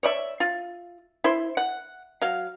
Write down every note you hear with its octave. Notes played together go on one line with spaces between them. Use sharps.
C#5 D5 E5
F4
E4 C5
F#5
F#3 F5